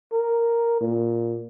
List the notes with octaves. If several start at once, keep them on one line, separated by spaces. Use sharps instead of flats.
A#4
A#2